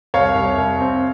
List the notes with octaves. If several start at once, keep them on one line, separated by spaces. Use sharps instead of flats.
C2 C#5 F5
C2
C2
C4